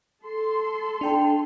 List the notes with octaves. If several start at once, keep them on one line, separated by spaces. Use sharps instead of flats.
A4 C6
D4 G5 A5